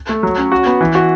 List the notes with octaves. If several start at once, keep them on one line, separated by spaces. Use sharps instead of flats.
A3
F#3
C#4
F#4
B3
E3
F#4